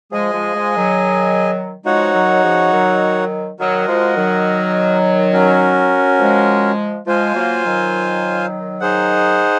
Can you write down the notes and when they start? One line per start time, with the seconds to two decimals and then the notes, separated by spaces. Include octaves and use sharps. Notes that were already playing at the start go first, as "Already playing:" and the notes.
0.12 F3 G#3 G#4 D#5 G#5
0.33 F3 G#3
0.55 F3 G#3
0.77 D#3 F#3
1.85 F3 G#3 D#4 F#4 C#5 F#5
2.14 D#3 F#3
2.43 C#3 F3
2.72 D#3 F#3
3.59 D#3 F#3 F#4 A#4 D#5 F#5
3.88 F3 G#3
4.17 D#3 F#3
5.33 C#4 F#4 A#4
6.19 F3 G#3
7.07 F3 G#3 F4 C5 F5 G#5
7.36 F#3 A#3
7.65 D#3 F#3
8.81 D#4 G#4 C5 F#5